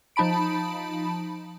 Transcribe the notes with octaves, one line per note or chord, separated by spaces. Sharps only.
F3 D#4 A5 B5 D7